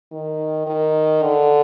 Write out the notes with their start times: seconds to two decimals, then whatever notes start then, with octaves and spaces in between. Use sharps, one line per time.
0.12 D#3
0.67 D#3
1.22 D3